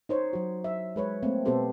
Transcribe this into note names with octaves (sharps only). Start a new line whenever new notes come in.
D#4 C5 C#5
F#3 F#4
E5
G#3 B4 C#5
A3 A#3 C4
B2 B3 C4 G4 A4 C5